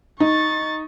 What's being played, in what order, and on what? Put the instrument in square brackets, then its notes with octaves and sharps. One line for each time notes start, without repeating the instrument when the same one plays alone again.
[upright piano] D#4 [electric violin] C#6 A6